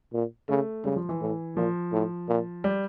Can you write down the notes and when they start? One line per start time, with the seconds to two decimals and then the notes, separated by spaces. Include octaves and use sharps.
0.13 A#2
0.49 C#3 A3
0.84 C#3 G3
0.96 F3
1.09 E3
1.21 A2
1.56 A#2 F3
1.92 A2
2.28 A#2
2.64 G3